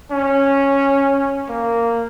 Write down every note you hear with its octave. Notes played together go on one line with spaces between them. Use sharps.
C#4
A#3